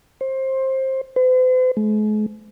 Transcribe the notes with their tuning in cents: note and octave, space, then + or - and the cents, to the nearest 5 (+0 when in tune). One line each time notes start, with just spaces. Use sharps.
C5 +20
C5 -45
G#3 +45